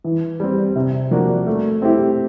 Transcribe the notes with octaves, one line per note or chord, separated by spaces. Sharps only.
E3
G3 C4
C3
F3 A#3 D4 F#4
A3
C4 E4 G4